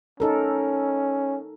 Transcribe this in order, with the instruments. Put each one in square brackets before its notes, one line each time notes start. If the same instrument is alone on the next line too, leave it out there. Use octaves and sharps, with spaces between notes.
[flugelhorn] C#4 [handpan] D#4 A4 A#4